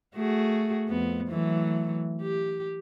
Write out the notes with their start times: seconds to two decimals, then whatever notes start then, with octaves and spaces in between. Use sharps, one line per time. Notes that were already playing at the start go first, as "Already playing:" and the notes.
0.16 A3 F#4 G#4
0.89 F2 B3
1.29 E3 F#3 A3
2.22 G4